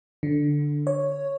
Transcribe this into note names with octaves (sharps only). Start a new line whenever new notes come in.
D3
C#5